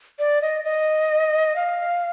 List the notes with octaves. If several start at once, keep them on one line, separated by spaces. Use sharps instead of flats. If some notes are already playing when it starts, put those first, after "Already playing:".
D5
D#5
D#5
F5